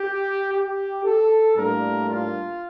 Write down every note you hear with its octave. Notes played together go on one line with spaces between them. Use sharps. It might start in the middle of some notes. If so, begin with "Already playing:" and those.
Already playing: G4
G4
A4
A2 G3 A#3 D4 A#4
F4